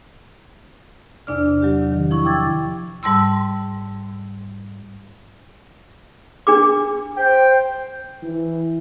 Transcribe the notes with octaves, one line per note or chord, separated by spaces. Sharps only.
E2 C3 D4 D5 F6
F#3 G4
D#3
F3 E4 C#6
G5 D6 E6 G#6 A6
G#2 G3 A5 C6 E6
D4 G#4 D6
C5 G5
E3